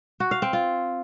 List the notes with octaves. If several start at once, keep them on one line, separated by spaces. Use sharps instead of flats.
F#4
F5
C4
F4